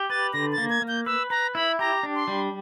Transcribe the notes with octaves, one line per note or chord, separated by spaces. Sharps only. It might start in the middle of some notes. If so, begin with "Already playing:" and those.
Already playing: G4
B4 A6
D3 A#6
A6
A#3
G#6
A#3
G6
B4 E6
B4 A#5
E4 B5
G4 A#5
D4
C6
G3